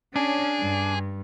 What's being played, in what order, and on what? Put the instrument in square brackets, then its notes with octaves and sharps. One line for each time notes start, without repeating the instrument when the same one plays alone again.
[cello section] C#4 [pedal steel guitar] D4 [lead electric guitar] G#4
[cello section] G2